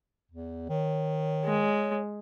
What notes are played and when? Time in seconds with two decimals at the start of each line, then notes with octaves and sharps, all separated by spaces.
0.31 E2
0.69 D#3 C#5
1.45 G#3